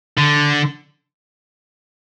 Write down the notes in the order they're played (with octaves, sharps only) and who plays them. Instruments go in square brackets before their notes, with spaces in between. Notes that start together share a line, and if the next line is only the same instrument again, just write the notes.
[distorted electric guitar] D3